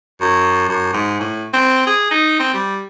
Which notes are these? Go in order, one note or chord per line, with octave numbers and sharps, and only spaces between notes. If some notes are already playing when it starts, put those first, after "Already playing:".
F#2
F#2
G#2
A2
C4
G#4
D#4
C4
G3